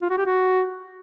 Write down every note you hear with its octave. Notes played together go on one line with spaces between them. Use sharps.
F4
F#4
G4
F#4